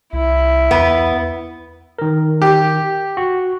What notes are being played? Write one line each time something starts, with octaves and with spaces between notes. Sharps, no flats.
C2 E4
E2 B3
D#3 A#4
G4
F#4